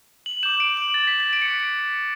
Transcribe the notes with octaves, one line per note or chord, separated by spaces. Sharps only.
F#7
D6 G6 E7
D7
F#7
A6
B6
A6
D7
C#7
C#6 F#6 B6
C#7